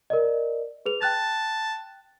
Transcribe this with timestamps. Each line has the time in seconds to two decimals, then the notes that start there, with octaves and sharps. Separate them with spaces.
0.10 A#4 D5 D#5
0.86 G#4 B4 F7
1.02 G5 A5 F#6 A6